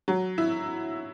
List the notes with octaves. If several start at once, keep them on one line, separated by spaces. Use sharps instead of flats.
F#3
E4